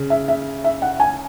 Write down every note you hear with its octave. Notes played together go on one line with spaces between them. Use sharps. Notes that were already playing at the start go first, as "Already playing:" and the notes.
Already playing: C#3
E5
E5
E5
F#5
G#5